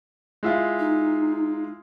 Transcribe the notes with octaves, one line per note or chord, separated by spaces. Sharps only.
G#3 E4 F4
D#4